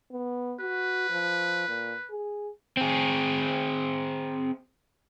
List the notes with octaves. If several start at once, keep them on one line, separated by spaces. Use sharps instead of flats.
B3
F#4 B4
F3
A#2
G#4
C4 G#4